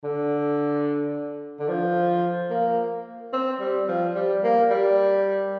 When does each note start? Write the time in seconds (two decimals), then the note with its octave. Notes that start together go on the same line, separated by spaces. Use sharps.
0.04 D3
1.60 D3
1.68 F3
2.51 A#3
3.33 C4
3.60 G3
3.88 F3
4.15 G3
4.44 A#3
4.71 G3